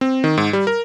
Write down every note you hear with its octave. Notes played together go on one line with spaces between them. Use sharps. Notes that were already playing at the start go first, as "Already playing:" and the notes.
C4
D#3
G#2
G3
A#4